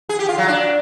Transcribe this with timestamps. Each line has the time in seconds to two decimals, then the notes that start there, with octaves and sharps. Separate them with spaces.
0.09 G#4
0.19 G4
0.29 F4
0.38 F#3
0.48 D4